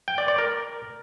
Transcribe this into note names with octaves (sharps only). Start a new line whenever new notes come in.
G5
D5
D5
A#4